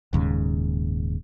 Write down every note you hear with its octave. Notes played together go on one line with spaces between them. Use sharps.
D#1 D#2 G#2 C#3